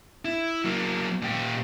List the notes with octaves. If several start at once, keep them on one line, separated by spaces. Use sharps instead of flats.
E4
F#3 A#3
A#2 G4